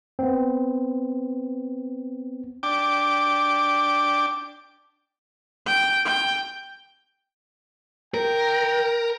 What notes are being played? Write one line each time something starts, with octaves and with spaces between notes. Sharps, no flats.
B3 C4
D4 G5 D6
G5
G5
A#4 G5